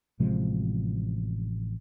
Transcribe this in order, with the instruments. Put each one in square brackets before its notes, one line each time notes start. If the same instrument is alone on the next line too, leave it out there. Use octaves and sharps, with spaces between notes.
[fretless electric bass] A1 C3 F3 G#3